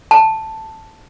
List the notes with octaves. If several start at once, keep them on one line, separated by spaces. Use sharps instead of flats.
A5